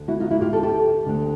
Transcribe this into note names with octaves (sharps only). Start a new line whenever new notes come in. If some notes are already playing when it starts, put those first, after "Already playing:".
Already playing: D2 D3
E4 F#4
D#4 F4
E4 F#4
F4 G4
G4 A4
G4 A4
D2 D3